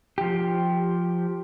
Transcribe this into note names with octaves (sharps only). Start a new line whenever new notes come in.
F3 G4